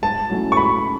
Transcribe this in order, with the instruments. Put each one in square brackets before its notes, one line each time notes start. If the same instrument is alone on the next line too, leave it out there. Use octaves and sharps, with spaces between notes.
[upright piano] G#2 [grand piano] A5
[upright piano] F#3 A3 C#4 E4
[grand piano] C#6
[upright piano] G#2 [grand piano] B5